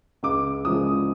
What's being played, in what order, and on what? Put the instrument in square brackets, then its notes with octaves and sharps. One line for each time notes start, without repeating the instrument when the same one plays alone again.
[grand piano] C#2 D6
C#3 F3 G#3 D#6